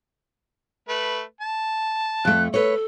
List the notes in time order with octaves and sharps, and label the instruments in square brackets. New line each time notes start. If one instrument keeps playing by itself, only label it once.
[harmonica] A3 B4
A5
[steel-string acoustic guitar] F2 A3 [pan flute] F#6
[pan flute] A4 [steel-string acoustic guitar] B4 C#5